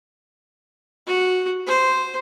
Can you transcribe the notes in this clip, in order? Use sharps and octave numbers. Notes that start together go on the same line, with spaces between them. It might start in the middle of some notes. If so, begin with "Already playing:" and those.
F#4
C5